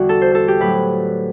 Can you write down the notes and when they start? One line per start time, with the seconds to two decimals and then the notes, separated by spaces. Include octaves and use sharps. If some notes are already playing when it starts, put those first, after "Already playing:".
Already playing: E2 D3 G3 F#4
0.09 A4
0.22 C5
0.35 A4
0.48 G4
0.60 A2 F#3 B4